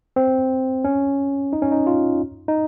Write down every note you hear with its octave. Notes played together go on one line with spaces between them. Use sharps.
C4
C#4
D#4
C#4
D#4
F4
D#4